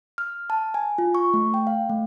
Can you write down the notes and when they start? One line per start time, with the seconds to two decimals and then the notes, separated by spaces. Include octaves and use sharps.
0.18 F6
0.50 A5
0.74 G#5
0.98 F4
1.15 C#6
1.34 A3
1.54 G5
1.67 F5
1.89 A3